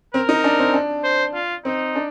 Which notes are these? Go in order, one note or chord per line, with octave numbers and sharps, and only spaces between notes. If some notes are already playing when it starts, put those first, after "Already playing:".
C4 A#4
D#4
D4
C4
D4
C5
F4
C4 D#4
D4